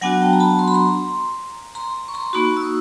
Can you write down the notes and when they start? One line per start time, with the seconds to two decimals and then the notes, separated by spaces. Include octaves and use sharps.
0.01 F#3 B3 D4 F#4 F#5 G#5
0.22 G5 A5
0.33 A#5
0.40 A5 B5
0.59 C6
0.68 B5
0.74 A#5 C6
1.75 A#5 C6
2.08 C#6
2.14 A#5 C6
2.33 A#3 D#4 F#4 B5 C#6
2.57 E6
2.62 C#6 D#6